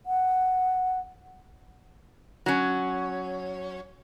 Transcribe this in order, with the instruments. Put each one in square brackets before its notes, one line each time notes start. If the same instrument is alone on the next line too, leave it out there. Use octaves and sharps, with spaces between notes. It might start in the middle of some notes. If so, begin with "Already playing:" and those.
[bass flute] F#5
[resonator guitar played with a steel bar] F#3 C#4